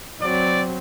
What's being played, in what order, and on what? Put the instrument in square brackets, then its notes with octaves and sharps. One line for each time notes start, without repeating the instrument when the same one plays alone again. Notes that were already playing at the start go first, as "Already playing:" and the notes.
[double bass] F#3 C4 [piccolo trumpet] D5